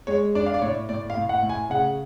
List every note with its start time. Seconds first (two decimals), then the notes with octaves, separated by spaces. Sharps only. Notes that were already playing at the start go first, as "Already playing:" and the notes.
0.07 G#3 C#5
0.35 D4 D5
0.46 F5
0.54 D5
0.62 A2 C#5
0.89 A2 D5
1.10 F5
1.17 A2
1.29 F#5
1.43 A2
1.49 G#5
1.70 C#3 F#5